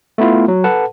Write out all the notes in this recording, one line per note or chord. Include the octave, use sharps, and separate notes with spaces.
A3 B3 E4 F4
F#3
A4 B4 F#5 A5